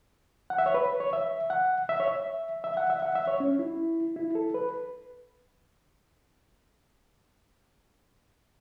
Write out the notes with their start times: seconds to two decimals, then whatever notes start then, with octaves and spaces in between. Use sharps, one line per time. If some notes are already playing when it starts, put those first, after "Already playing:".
0.50 F#5
0.58 E5
0.66 C#5
0.74 B4
1.00 C#5
1.13 E5
1.50 F#5
1.89 E5
2.00 C#5
2.08 E5
2.64 E5
2.77 F#5
2.90 E5
3.02 F#5
3.15 E5
3.27 C#5
3.40 C#4
3.59 E4
4.16 E4
4.35 A4
4.54 B4